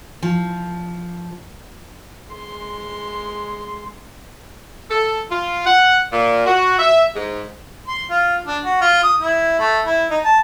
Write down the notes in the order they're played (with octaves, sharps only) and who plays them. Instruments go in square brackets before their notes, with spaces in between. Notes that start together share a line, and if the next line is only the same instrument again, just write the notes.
[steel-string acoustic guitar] F3
[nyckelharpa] G#3 C6
[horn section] A4
F4
F#5
A#2
F#4
E5
G#2
[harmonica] C6
F4
D4
F#4
F4
D#6
E4
A3
E4
D#4
A5